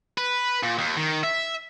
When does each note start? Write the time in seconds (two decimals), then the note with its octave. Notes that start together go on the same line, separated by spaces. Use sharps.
0.18 B4
0.63 A#2
0.78 D#2
0.97 D#3
1.24 E5